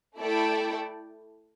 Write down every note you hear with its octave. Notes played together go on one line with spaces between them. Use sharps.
A3 E4 A4 D5 G5